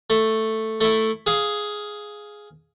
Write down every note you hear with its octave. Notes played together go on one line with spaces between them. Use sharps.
A3
A3 E4
G#4 F5